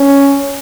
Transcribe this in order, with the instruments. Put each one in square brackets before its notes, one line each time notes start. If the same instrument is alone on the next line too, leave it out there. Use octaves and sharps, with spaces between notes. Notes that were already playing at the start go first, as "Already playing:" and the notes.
Already playing: [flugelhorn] C#4